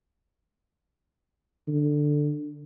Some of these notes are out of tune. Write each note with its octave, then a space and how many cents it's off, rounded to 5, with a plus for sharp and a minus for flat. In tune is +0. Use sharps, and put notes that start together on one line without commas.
D3 +10